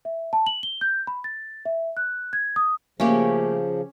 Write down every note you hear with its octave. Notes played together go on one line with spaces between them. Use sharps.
E5
A5
F#7
G7
G6
B5
A6
E5
F#6
G#6
D#6
C#3 F3 A3 A#3 C#4 G4 F5